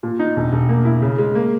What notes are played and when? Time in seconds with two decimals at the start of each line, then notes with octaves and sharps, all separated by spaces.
0.03 A#2
0.19 D#4
0.36 E1
0.52 E1
0.69 A#3
0.85 E4
1.02 C#3
1.18 G#3
1.35 A#3